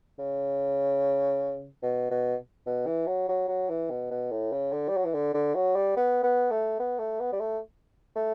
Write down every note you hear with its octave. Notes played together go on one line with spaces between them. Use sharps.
C#3
B2
B2
B2
E3
F#3
F#3
F#3
E3
B2
B2
A2
C#3
D3
G3
F#3
E3
D3
D3
F#3
G3
B3
B3
A3
B3
A3
B3
G3
A3
A3